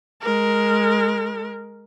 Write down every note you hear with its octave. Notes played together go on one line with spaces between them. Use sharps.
G#3 A#4